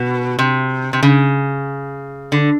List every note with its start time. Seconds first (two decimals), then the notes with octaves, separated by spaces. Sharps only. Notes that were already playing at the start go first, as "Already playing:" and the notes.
Already playing: B2
0.39 C3
0.93 C3
1.03 C#3
2.32 D3